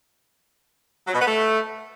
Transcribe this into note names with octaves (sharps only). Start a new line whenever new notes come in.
F#3
B2
B3
A3